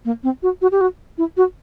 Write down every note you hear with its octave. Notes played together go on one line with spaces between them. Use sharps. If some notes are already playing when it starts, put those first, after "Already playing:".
A#3
C4
F#4
F#4
G4
F#4
E4
F#4